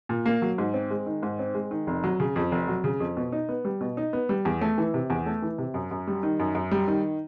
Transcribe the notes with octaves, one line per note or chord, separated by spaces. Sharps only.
A#2
A#3
F#3
G#2
C4
G#3
D#3
G#2
C4
G#3
D#3
F1
F#3
C#3
F2
F1
F#3
C#3
F2
B2
D#4
B3
G3
B2
D#4
B3
G3
E2
A3
E3
C3
E2
A3
E3
C3
F#2
F#2
G3
D#3
F#2
F#2
G3
D#3